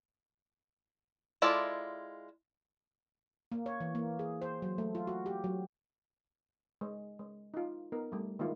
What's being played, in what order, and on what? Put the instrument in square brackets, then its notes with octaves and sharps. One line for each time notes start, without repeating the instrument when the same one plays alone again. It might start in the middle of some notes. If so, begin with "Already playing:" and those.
[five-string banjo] G#3 E4 F4 A4 D5
[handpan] A#3
C#5
E3
A#3
G#4
C5
F#3
A3
F4
F#4
G4
F#3
[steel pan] G#3
G#3
D#4 F4
B3 D#4 A#4
G3 A3
D#3 G#3 A#3 E4 F4